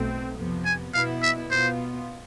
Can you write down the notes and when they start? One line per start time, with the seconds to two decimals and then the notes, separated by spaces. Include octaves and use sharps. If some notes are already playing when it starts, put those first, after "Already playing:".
Already playing: B1 B2 A3 C4
0.37 F2 C3 F3 B3
0.65 G#5
0.93 B2 B3 E4 F5
1.22 E5
1.51 B2 B3 F4 C5